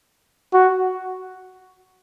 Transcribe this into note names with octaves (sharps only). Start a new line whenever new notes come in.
F#4